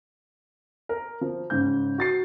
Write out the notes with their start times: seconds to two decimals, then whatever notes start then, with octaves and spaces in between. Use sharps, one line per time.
0.89 A#4
1.21 F3
1.50 G#2 C#3 G6
1.98 F#4 A6 C7